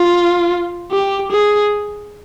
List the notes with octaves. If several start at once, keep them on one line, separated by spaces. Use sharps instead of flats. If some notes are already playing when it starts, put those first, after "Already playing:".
Already playing: F4
G4
G#4